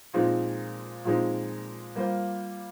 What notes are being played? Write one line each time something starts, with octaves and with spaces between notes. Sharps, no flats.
A#2 F3 G#3 C4 D#4
A#2 F3 G#3 C4 D#4
G3 A#3 F4 C5